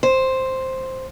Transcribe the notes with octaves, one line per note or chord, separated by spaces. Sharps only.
C5